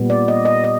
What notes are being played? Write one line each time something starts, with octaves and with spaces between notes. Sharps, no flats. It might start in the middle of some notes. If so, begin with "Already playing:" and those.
Already playing: A#2 G3 B3
D5
D#5
D#5
D#5